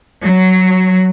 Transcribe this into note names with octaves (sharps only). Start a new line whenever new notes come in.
F#3